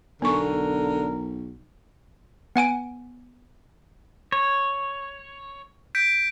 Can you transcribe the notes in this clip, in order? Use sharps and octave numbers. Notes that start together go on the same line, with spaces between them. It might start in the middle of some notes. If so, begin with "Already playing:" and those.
B1 D3 B3 A#4 C#6
B3 F#5 G#5 D7
C#5
G6 B6 D7